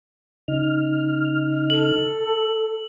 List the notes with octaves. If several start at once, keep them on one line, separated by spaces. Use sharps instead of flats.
C#3 D#4 F6
A4 F#7